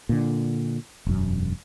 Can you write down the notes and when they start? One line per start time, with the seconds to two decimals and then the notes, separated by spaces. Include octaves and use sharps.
0.09 A#2 D3
1.07 E1 F#2